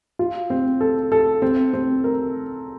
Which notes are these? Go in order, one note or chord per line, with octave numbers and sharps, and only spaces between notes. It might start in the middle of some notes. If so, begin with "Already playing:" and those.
F4
C4
A4
A4
C4
C4
A#4